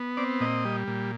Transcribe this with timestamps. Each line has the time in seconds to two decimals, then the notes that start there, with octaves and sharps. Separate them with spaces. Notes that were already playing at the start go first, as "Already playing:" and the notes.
Already playing: B3
0.17 C4 D5
0.40 A#2 D#5
0.65 G3
0.87 A#2